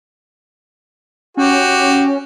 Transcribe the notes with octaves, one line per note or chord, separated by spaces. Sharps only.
C#4 F#4 G4